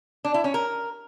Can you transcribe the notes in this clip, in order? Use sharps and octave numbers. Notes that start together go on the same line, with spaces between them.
D4
E4
C#4
A#4